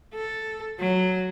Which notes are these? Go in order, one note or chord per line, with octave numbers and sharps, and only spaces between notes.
A4
F#3